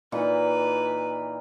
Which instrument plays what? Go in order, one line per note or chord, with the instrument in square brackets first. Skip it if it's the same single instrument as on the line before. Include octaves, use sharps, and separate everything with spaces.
[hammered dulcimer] A#2 E3 D#4 [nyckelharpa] B4